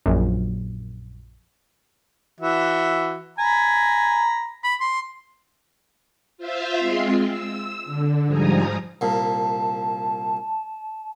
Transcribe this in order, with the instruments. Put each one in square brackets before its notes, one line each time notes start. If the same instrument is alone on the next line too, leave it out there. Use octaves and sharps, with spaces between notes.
[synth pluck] A#1 F#2
[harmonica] E3 F#4 E5
[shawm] G#5 [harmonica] A#5 B5
[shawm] B5
C6
[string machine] F4 C5 E5 F5
G#3 C4 F4
E6
D3
G#2 F3 G3 G#5 A#5 D#6
[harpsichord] C2 A#2 [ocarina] A5